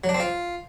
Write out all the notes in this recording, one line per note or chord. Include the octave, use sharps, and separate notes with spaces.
F#3
D4
C4
F4